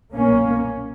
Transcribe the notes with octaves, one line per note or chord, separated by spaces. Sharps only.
B1 A#2 A#3 C#4